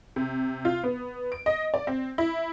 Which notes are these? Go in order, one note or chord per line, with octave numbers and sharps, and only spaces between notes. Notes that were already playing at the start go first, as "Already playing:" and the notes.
C3
F4
B3
D7
D#5
D5
C4
E4